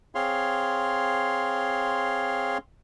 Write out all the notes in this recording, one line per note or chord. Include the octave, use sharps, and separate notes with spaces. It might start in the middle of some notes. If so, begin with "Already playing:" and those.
C4 G#4 C#5 F5 C6